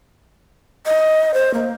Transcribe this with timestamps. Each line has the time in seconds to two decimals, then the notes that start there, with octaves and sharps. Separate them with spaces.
0.86 D#5
1.34 C5
1.54 A#3